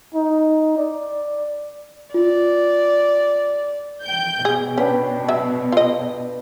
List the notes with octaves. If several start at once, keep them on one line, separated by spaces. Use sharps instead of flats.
D#4
D5
F4 D5
G5 G6
B2 G#4
C#4 D4 B4 G5
F#3 E5
F4 D#5